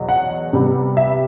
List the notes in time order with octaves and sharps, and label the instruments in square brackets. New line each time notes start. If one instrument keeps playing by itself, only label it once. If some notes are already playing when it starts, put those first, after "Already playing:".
Already playing: [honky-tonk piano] E2 B2 F#3
F#5
C3 G3 B3
E5